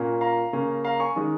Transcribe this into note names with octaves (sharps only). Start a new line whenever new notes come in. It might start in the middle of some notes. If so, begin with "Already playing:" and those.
Already playing: A#2 A#3 C#4
F5 A#5
C#3 A#3 C#4
F5 A#5
G#5 C#6
D#3 G#3 C#4